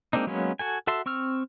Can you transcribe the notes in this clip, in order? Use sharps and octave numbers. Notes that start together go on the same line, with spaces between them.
G#3 A#3 C4 D4 D#4
F#3 G#3 A#3 B3 C#4
F#4 A4 G#5
F#4 A4 E5 A5 C6
C4 C#6 E6 F6